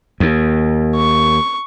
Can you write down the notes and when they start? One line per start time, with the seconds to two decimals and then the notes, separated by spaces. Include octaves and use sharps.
0.20 D#2
0.96 C#6